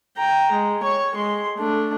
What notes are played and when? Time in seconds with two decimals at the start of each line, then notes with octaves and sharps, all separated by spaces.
0.17 G5 A#5
0.52 G#3
0.83 C#5 C#6
1.15 G#3 C6
1.57 A3 D4